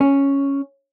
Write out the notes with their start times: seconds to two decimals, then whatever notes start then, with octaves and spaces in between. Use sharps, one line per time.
0.01 C#4